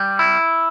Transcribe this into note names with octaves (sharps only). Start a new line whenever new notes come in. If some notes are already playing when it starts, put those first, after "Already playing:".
Already playing: G3
E4